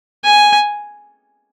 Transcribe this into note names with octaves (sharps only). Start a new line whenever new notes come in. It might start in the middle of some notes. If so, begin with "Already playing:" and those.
G#5